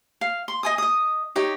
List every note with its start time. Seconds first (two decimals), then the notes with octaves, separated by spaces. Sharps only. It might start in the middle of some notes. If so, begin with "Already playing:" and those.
0.21 F5
0.48 C6
0.63 D#5 G#5 D#6
0.78 D#5 D#6
1.36 D#4 G4 C#5